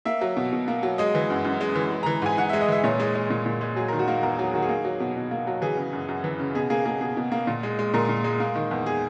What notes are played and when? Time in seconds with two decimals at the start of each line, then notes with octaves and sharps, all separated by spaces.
0.05 A#3 E5
0.21 F#3
0.37 B2
0.52 B2
0.68 A#3
0.83 F#3
0.98 G#3 D#5
1.15 E3
1.30 F#2
1.45 F#2
1.61 G#3
1.75 E3
1.92 G#3
2.03 A#5
2.06 E3
2.22 G#2 G#5
2.38 G#2 F#5
2.50 E5
2.53 G#3
2.61 D#5
2.68 E3 E5
2.84 A#2 C#5
3.00 G#3
3.15 G#3
3.30 A#2
3.46 A#2
3.61 G#3
3.76 F#3 G#4
3.88 A#4
3.93 D#3
3.99 F#4
4.08 A#3
4.23 E2 A#4
4.39 F#3
4.46 G#4
4.54 D#3 F#4
4.62 G#4
4.69 A#3
4.85 F#3
5.00 B2
5.16 B2
5.31 A#3
5.47 F#3
5.62 E3 G#4
5.77 C#3
5.93 F#2
6.09 F#2
6.24 E3
6.39 C#3
6.55 B2 G#4
6.70 A#3 G#4
6.85 A#3 G#4
7.01 B2 G#4
7.17 B2
7.32 A#3
7.47 A#2
7.63 G#3
7.79 G#3
7.94 A#2 A#4
8.09 A#2
8.24 G#3
8.40 A#3
8.56 D#3
8.71 E2
8.86 G#4